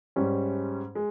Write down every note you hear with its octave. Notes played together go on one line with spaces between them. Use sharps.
G#2 G3 C#4
G#3